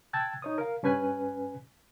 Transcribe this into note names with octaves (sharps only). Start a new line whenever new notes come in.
G5 A5 E6 F#6 G#6 A6
D#4 C#5 D#6
A#4 F5
G2 C#4 B4 G#5 F#6